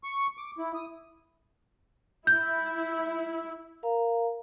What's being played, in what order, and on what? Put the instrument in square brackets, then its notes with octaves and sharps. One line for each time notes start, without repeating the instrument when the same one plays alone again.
[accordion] C#6
D6
E4
D#6
[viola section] E4 [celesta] G6
[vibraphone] A#4 F5 A#5